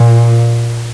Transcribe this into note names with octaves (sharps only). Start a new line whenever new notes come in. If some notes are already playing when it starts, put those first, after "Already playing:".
Already playing: A#2